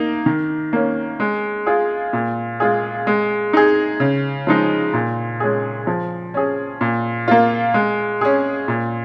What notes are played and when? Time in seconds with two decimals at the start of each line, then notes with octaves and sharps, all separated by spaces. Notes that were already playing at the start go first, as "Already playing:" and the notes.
Already playing: A#3 D#4
0.26 D#3
0.73 A#3 C#4
1.20 G#3
1.66 F4 G#4
2.13 A#2
2.60 G#3 F4 G#4
3.07 G#3
3.53 D#4 G#4
4.00 C#3
4.47 F3 G#3 D#4
4.94 A#2
5.40 G#3 C#4 G#4
5.87 F3
6.34 C#4 G#4
6.81 A#2
7.28 A#3 F4
7.74 G#3
8.21 C#4 G#4
8.68 A#2